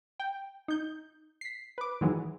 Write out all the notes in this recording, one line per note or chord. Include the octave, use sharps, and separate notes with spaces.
G5
D#4 G6
B6 C7
B4 D6
D#3 E3 F#3 G#3 E4